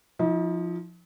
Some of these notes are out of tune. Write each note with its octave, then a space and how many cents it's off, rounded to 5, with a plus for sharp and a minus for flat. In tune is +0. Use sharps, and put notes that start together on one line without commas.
F3 +0 D#4 +45